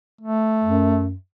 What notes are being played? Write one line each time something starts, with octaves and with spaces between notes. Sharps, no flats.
A3
F#2